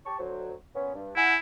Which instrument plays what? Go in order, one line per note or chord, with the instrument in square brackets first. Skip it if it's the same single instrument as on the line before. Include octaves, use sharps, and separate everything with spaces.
[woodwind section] G4 A5 C#6
D2 F#3 C5
A#2 B3 C#4
G2
[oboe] E4 [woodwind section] F#5 G#5